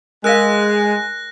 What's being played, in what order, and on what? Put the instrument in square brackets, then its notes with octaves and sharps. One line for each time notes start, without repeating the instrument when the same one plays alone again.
[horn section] G#3 [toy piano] A#4 F5 [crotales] F#6 A#6